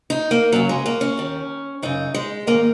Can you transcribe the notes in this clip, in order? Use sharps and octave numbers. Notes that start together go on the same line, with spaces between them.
D#4
A#3
F#2 C#3 F#3
G#3
A#3
C#4
D#2 D#3
F#2 C#3 D#4
G#3
G#2 D#3 A#3